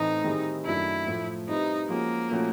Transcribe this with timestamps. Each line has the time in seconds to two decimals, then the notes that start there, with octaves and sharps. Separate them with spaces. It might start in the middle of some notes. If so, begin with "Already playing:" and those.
Already playing: A2 E3 A3 C4 D#4
0.24 D#3 G3 C4 E4 G#4
0.65 F#2 D#3 F#3 A3 D4 E4
1.06 A2 F3 A3
1.48 G3 C4 D#4 E4 G4 B4
1.89 F3 G#3 A#3 C#4 F#4
2.30 A#2 F3 A3 C#4 F#4